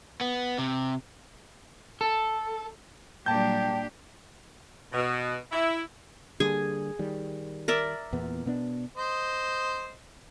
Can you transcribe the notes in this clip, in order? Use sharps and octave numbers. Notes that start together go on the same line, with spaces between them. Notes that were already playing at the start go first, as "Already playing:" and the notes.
B3
C3
A4
A#2 F#3 G3 D4 G4 G5 A5 G6
B2
E4
D3 G3 A#3 G#4 G#5
D#3 G3
A#4 D5 E5
E2 A#2 B3
B2 B3 D4
C5 D#5